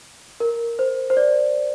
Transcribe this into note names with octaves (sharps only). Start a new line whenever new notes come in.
A#4
C5
C5
D5